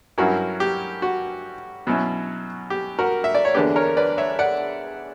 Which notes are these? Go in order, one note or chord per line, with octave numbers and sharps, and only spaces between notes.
G2 F#3 C#4 E4 F#4 A#4
G4
F#4
B2 F#3 C#4 E4
G4
F#4 A#4
E5
D5
C#5
E2 D3 A#3 D4 G4 B4
A#4 C#5
B4 D5
C#5 E5
D5 F#5